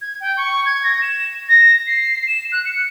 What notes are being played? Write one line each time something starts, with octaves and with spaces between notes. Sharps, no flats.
G#6
G5
C#6
G#6
A#6
E7
A#6
C7
E7
F#6
C#7